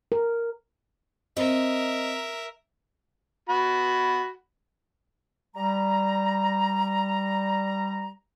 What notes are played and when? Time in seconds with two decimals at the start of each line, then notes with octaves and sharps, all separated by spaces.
0.12 A#4
1.36 C4 A#4 D#5 E5
3.49 F#4 B5
5.55 G3 A#5